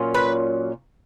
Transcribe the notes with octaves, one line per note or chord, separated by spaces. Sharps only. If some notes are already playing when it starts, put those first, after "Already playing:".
Already playing: A#2 F#3 C#4 F4
B4